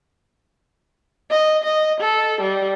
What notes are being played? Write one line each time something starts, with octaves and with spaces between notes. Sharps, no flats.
D#5
D#5
A4
G3